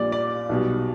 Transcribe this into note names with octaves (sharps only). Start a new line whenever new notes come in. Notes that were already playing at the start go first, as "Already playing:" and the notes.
Already playing: A#1 A#2 G3 D5
D5
B1 B2 G3